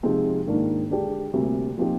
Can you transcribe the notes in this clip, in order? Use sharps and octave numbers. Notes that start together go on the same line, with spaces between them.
C3 F3 G#3 C4 D#4
G#2 D#3 A#3 D4
D3 G#3 D4 G4
D2 C3 G3 A#3
A#2 F3 C4 D#4 G4